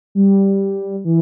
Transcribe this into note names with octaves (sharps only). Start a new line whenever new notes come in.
G3
E3